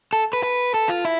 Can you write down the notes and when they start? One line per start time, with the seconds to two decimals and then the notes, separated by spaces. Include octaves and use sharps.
0.13 A4
0.33 B4
0.43 B4
0.74 A4
0.89 F4
1.05 E4